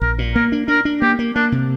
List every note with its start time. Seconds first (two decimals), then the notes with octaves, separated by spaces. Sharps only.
0.01 A#1 A#4
0.19 A#2
0.35 A#3 A#4
0.52 D4
0.68 D4 A#4
0.85 D4
1.02 A#3 G4
1.19 A#3
1.35 A#3 D4
1.52 C3